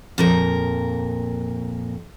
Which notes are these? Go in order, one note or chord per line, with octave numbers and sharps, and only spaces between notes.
F2 A#2 A#4